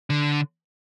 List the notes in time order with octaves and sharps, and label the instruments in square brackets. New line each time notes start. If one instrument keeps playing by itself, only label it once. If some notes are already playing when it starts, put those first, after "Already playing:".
[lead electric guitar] D3